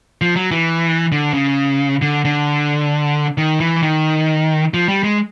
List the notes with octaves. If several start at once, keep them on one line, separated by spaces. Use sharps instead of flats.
F3
F#3
E3
D3
C#3
D3
D3
D#3
E3
D#3
F3
G3
G#3